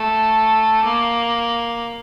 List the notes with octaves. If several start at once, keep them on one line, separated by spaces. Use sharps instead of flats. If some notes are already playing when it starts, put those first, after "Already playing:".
Already playing: A3
A#3